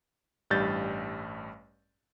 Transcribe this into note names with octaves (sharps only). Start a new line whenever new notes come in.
A1 G2 G3 G6 A6